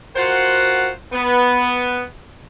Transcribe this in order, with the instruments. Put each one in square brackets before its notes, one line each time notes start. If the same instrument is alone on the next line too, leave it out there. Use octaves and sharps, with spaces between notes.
[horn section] F4 F#4 A#4 C5 F#5
B3